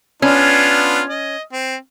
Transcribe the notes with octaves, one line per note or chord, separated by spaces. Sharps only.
B3 C#4 D4 F4
D#5
C4